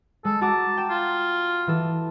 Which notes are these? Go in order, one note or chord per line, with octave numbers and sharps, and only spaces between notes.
G#3 A4
F#4 A5 A#5 D6
G5 E7
F4
E3 A4